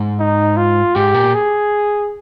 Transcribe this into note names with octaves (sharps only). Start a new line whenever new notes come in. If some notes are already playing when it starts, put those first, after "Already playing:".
Already playing: G#2
D#4
F4
G#2 G4
A#2
G#4